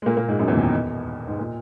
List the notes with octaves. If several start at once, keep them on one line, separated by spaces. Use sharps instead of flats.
G#3
A#2 A#3
A#2 A#3
G#2 G#3
F#2 F#3
E2 E3
D#2 D#3
B1 B2
G#2
A#2